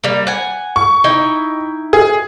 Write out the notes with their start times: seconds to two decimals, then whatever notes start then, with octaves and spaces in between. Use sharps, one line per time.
0.04 G3 A#3
0.27 F#5 G#5
0.76 C#6
1.04 D#4 E4 G5
1.93 G#4